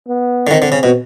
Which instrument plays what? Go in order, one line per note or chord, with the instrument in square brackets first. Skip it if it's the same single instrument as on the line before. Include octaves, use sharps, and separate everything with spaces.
[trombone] B3
[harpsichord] D3
[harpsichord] D#3 [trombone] C4
[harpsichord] D3
C#3
B2